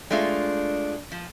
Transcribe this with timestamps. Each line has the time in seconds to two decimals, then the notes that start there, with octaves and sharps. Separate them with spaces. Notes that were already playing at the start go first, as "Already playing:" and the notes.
0.10 G#3 A3 D4 F4
1.12 F3